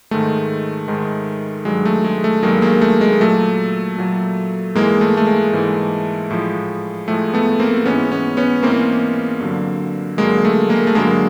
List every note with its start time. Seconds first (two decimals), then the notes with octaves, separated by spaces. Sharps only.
0.11 G#2 D#3 G#3 A3
0.88 G#2 D#3 G#3
1.65 G2 D#3 F#3 G#3
1.85 A3
2.04 G#3
2.24 A3
2.43 G2 D#3 F#3 G#3 A#3
2.62 G#3 A#3
2.82 A3
3.01 G#3
3.12 A#3
3.20 A#2 F#3 A3
3.98 A#2 F#3
4.75 G#2 E3 G#3 A#3
5.01 A3
5.17 A3
5.27 G#3
5.53 G#2 E3 G#3
6.30 A2 F3 G#3
7.08 A2 F3 G#3 A3
7.34 A3 B3
7.59 A#3 C4
7.86 G#2 E3 G#3 B3 C#4
8.12 B3 C#4
8.37 B3 C#4
8.63 G#2 E3 G#3 A#3 C4
9.40 G2 D3 F#3
10.18 G2 D3 F#3 G#3 A#3
10.45 A3
10.69 G#3 A#3
10.87 A3
10.95 G2 D3 F#3 G#3 A#3